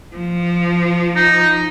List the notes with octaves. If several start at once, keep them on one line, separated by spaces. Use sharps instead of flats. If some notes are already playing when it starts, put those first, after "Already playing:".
F3
D#4